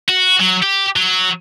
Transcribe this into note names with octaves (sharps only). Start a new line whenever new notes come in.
F#4
F#3
G4
F#3